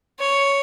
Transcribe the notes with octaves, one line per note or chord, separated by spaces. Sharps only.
C#5